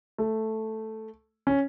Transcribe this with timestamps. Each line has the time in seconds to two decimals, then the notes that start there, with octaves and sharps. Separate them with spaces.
0.18 A3
1.47 C#4